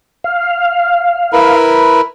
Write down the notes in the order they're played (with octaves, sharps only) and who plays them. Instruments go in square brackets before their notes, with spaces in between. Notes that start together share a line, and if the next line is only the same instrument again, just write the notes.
[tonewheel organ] F5
[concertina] E4 A#4 B4